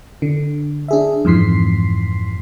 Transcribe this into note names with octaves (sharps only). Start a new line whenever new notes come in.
D3
D4 G#4 E5
F2 G#2 E3 C6 B6 C7